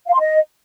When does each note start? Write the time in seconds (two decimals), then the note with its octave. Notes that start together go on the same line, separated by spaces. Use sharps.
0.07 F5
0.13 C6
0.20 D#5